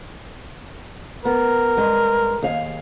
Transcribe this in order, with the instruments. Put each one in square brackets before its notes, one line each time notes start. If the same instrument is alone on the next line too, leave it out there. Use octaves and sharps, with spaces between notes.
[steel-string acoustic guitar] B3 [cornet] A#4
[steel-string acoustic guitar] G2 G#3
D#2 G#4 F5